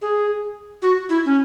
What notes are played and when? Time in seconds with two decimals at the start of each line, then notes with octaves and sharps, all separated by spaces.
0.02 G#4
0.82 F#4
1.09 E4
1.26 C#4